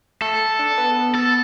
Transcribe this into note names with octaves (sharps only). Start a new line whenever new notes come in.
A3 A4
D4
B3
A4